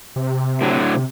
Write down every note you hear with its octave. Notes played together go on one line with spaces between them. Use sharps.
C3
A2 D3 F#3
C3